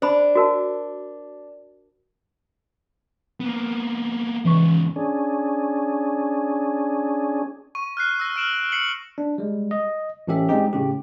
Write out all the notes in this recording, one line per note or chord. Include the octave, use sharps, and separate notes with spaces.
D4 C5 B5
F#4 A#4 A5
A#3 B3
G#2 C#3 E3 C#6
C#4 D4 G#4
C#6 D#7
F6 F#6 C7
E6 A#6
F6 D7 E7 F#7
C7 C#7 F#7
D4
G3 G#3
D#5
A1 A2 C#4 G4 E5
G3 G#3 C4 D#4 G4 G#4
A2 C#3 G4